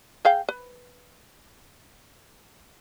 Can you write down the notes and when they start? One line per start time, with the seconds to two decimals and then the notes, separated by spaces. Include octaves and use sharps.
0.25 G#4 F5 G5
0.49 B4